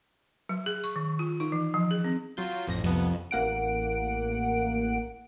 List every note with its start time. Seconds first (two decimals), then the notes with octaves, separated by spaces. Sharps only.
0.49 F#3
0.66 G#4
0.84 C#6
0.96 D#3
1.19 F4
1.40 D#4
1.52 E3
1.74 F3
1.91 G#4
2.04 C4
2.37 F#3 F4 G6
2.67 A1 F2 A#6
2.84 C2 F2 B3
3.31 A1 A#3 F#5 D7